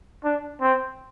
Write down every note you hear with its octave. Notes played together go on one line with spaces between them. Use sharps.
D4
C4